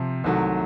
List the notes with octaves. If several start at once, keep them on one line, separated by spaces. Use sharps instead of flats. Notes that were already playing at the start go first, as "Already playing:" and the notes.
Already playing: C3 F3
C2 C3 D#3 F#3 A3